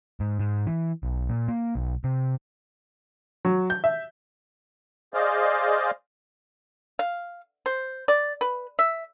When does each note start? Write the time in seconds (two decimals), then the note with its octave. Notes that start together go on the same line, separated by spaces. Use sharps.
0.20 G#2
0.39 G#2
0.67 E3
1.03 B1
1.29 A#2
1.48 A#3
1.75 B1
2.04 C3
3.45 F#3
3.70 G6
3.84 E5
5.14 G#4 C5 D5 D#5 F5
6.99 F5
7.66 C5
8.08 D5
8.41 B4
8.79 E5